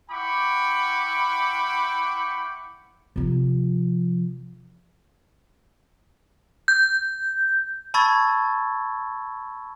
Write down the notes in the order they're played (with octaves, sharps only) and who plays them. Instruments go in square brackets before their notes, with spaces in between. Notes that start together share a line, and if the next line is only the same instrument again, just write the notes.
[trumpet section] E4 F#5 G5 B5 C#6 D6
[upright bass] C3 F3
[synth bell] G6
[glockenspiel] A5 B5 C#6 E6 G#6 A6